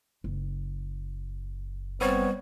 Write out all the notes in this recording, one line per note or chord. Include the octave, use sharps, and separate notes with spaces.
F#1
G3 B3 C4 C#5